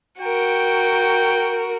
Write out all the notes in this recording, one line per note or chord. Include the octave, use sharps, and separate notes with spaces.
F#4 A#4 G5